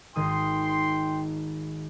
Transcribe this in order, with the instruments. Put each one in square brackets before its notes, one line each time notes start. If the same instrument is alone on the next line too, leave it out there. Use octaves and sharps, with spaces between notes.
[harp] G#1 D#3 D#6 [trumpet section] G5 C6